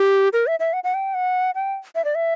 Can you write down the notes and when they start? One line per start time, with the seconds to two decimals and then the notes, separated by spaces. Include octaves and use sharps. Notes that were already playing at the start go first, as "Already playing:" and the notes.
Already playing: G4
0.33 A#4
0.47 E5
0.60 E5
0.73 F#5
0.84 F#5
0.94 G5
1.14 F#5
1.55 G5
1.95 E5
2.05 D5
2.15 E5